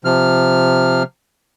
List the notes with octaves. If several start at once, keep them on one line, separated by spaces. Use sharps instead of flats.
C3 F3 F6